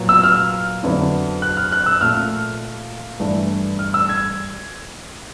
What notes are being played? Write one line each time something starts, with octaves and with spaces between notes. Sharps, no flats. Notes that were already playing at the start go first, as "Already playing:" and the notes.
Already playing: A#2 F#3 B3
E6
F6
F2 D3 F#3 B3 E4
F#6
F6
F#6
E6
A#2 F3 A3 F6
G2 E3 A3 D4
F6
E6
G#6